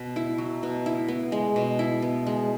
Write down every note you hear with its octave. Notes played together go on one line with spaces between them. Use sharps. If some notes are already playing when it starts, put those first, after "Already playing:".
Already playing: B2 B4
E4
F#3
B2
E4
B3
G#3
B2
E4
B3
G#3